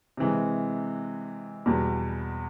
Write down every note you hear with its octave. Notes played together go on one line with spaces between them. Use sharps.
C3 E3 G#3
E2 B2 G3